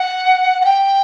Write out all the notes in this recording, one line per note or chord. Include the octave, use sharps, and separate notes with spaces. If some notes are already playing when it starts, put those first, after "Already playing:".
Already playing: F#5
F#5
G5